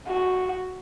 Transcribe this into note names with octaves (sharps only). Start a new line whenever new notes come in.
F#4